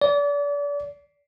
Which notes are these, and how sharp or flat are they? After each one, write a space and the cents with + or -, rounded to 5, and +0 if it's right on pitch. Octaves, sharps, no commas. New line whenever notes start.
D5 -35